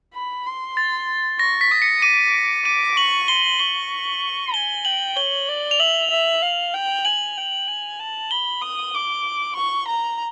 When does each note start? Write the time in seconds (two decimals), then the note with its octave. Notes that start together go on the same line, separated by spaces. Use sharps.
0.14 B5
0.46 C6
0.77 A6
1.39 C#6 A#6
1.61 B6
1.71 D#6
1.82 C#7
2.02 D6 D#7
2.65 D6 D#7
2.96 C#6 F#7
3.28 C6 G7
3.59 C#6 G7
4.54 G#5 G7
4.85 G5 F#7
5.16 C#5 G7
5.48 D5
5.71 F7
5.80 E5 F#7
6.11 E5
6.42 F5
6.74 G5
7.05 G#5 F#7
7.37 G5
7.68 G#5
7.99 A5
8.31 B5 G7
8.61 D#6
8.94 D6
9.56 C#6
9.88 A#5